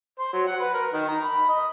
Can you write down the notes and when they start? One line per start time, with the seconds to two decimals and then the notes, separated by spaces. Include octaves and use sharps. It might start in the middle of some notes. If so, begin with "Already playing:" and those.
0.20 C5
0.33 F#3
0.47 F#5
0.60 B4
0.74 A#4
0.93 D#3
1.08 A#5
1.25 B5
1.49 D#5